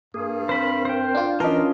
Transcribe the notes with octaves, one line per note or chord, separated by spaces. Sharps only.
G2 A#3 G#4
C4 A#4 C5 B5
C5 G5
D4 F4
E3 C#4 D4 F4 A#4 D#5